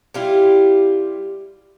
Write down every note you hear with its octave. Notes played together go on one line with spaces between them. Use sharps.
G3 E4 F4 G4